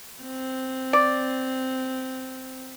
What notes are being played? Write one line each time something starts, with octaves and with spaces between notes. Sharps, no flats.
C4
D5